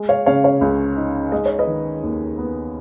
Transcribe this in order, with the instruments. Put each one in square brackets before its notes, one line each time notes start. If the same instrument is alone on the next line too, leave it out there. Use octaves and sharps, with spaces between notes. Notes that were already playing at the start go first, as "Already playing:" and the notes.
Already playing: [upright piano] G#3
[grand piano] C#5 F5
[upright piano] C#3 [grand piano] C#5 F5
[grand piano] C#5 F5
[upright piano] C#2
D#4
[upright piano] G#3 [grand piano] D#5
[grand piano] C#5
B4 D#5
[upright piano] D#3
D#2
B3